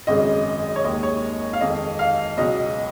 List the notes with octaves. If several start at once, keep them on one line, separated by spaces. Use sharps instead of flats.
G#1 F#2 C#3 G#3 D#5
C#5
D#2 D#3 G#3 D#5
C#5
F5
F2 D#3 G#3 D#5
F5
C#2 B2 F#3 D#5